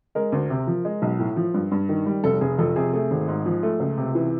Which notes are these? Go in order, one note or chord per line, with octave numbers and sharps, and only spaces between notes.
G#3 A#4
D2
C3
F3
G#3
B1
A2
F3
G2
G2
D#3
G3
F1 A4
F1 G#4
F2 A4
C3 G#4
A3 G#4
G#1
G#2
F3
A3
C#2
C3
E3